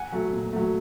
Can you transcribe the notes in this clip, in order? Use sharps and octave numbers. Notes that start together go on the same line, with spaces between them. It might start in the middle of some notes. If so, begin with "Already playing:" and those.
Already playing: F#5 G#5
F#3 A3
A#2
F#3 A3